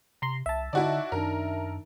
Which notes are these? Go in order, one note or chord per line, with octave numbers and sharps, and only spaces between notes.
C3 A#5 C6
C2 E5 A5
D3 D#4 E4 F#4 D5 D#5 F#5
F#2 D#3 D4 D#4 A#4